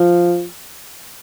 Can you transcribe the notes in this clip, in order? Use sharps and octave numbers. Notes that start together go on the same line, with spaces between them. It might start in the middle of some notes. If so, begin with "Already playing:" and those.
Already playing: F3